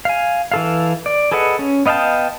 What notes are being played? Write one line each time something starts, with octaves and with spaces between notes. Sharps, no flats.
F5 G#5
E3 A4 F5
D5
G#4 A4 B4 D#5 F#5
C#4
B3 D#5 F5 G5 A5